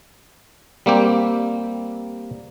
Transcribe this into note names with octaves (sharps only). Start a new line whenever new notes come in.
G3 A#3 C4 G4